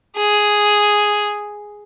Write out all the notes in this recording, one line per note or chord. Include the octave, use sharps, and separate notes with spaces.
G#4